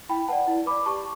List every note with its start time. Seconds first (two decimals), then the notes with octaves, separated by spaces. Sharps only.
0.09 E4 G5 B5
0.28 B4 D5 F#5 A5
0.47 E4
0.66 B4 D5 B5 D6
0.86 G4 A5 C#6